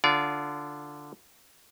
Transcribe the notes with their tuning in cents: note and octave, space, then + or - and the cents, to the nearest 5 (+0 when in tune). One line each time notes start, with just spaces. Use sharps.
D3 +0 F4 +0 D5 -35